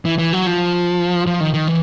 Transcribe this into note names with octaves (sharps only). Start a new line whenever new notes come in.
E3
E3
F#3
F3
F3
D#3
D#3
E3